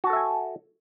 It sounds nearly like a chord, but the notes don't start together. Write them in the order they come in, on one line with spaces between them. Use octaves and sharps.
F#4 A5 A4 E5 G#5